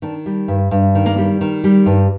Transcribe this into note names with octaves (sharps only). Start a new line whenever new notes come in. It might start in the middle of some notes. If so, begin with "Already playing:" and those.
D#3 D4
G3
G2
G2
D#3
A#3
G3
D#3
G3
G2